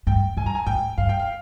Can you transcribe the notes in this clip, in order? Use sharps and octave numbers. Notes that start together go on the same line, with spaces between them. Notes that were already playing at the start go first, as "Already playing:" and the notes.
G2 G5
G2 G#5
A#5
G#5
G#2 G5
G2 F5
G5
F5